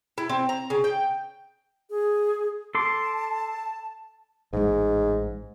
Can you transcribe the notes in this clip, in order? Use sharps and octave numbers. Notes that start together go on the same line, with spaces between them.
E4
C4
A#5
C#3
G5
G#4
A4 A5 C6 D6
A1 G#2 G#3